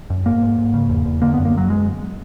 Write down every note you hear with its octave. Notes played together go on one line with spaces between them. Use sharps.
F#2
G#2 A#3
G#2
G#2
C#3
E2
E2
D3 A#3
F#2 B3
A#3
F#2 F#3
G#3